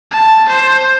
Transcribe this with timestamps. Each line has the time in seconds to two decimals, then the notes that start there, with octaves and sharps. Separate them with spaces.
0.11 A5
0.49 C5